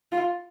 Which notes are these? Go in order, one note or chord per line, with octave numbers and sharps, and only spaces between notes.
F4